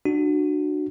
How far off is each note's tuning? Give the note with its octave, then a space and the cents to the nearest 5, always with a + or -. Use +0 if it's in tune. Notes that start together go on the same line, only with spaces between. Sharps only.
D4 +30 F#4 +0